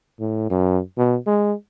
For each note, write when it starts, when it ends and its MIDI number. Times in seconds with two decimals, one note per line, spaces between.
0.20 0.48 45
0.50 0.79 42
0.98 1.17 47
1.27 1.53 56